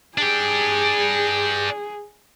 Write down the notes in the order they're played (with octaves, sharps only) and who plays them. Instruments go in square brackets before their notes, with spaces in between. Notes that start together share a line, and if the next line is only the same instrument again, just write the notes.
[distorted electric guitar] D4 G4 [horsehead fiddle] G#4